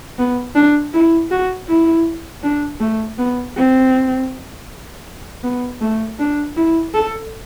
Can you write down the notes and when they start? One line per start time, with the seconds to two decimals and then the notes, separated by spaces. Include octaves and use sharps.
0.18 B3
0.55 D4
0.93 E4
1.31 F#4
1.68 E4
2.43 D4
2.80 A3
3.18 B3
3.57 C4
5.43 B3
5.81 A3
6.19 D4
6.57 E4
6.94 A4